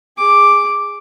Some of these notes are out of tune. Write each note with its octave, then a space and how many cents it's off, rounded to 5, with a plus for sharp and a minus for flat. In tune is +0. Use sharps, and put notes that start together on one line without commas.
G#4 -15 D6 +0